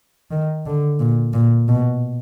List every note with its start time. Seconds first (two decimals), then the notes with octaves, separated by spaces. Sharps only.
0.31 D#3
0.66 D3
0.99 A#2
1.34 A#2
1.68 B2